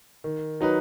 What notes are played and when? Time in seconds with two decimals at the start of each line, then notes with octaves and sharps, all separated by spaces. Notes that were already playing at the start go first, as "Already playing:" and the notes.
0.24 D#3
0.61 F#3 D#4 B4